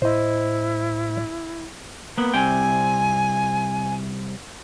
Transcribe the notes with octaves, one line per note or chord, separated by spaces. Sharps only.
A2 E4 C5 D#5
A#3 B3
C2 C3 G5 G#5